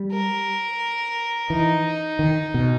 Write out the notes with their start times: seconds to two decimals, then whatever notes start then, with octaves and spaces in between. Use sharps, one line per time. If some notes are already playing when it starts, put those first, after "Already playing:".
Already playing: G3
0.12 A#4
1.50 E3 D#4
2.19 D#3
2.54 B2